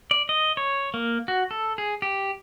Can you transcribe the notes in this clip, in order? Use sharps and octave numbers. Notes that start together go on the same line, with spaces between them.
D5
D#5
C#5
A#3
F#4
A4
G#4
G4